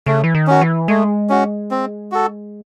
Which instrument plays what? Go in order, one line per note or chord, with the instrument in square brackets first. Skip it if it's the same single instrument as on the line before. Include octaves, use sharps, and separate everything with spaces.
[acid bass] C#3 [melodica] A3
[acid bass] E3
D#3
[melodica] C#4 F#4
[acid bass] E3
[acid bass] G#3 [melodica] A3
[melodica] C#4 F#4
C4
F#4 A4